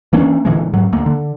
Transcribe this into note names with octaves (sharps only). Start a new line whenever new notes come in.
E3 A#3 C#4 D4
A#2 D3 E3 G#3
G#2 F#3
D2 A#3
D3